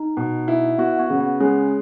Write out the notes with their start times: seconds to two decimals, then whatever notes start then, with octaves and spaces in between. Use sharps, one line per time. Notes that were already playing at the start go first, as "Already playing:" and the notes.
Already playing: D#4
0.17 B2
0.48 E4
0.78 B3 F#4
1.00 B3
1.10 C#3
1.20 B3
1.40 G#3 C#4